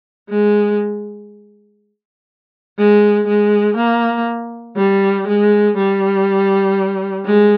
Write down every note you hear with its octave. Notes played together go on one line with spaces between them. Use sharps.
G#3
G#3
G#3
A#3
G3
G#3
G3
G#3